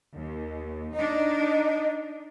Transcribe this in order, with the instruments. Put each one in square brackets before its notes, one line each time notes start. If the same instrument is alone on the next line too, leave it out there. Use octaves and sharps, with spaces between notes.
[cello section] D#2
[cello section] D4 D#4 [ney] D#5